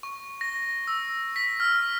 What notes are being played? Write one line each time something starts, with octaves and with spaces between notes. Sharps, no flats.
C#6
A#6
E6
B6
F6